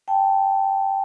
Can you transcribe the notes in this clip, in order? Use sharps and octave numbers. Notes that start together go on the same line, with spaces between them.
G5 A5